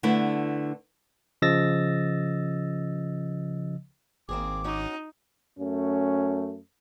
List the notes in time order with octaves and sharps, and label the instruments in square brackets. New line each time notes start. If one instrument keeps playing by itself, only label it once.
[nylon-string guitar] D3 A3 B3 D4 E4
[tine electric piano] C#3 F3 D#5 E6 A6 A#6
[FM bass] G#1 [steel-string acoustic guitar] A#3 C4 G#4 [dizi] D6
[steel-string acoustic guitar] C#4 F#4 [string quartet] D#4
[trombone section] F#2 A3 C#4